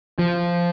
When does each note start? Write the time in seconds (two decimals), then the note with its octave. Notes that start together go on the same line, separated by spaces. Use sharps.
0.19 F3